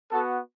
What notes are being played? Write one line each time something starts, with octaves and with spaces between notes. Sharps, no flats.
B3 F#4 A4